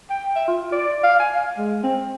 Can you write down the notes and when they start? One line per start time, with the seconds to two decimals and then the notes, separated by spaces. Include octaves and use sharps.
0.10 G5
0.36 E5
0.47 F4
0.72 D5
1.04 F5
1.19 G#5
1.35 F5
1.57 G#3
1.83 C4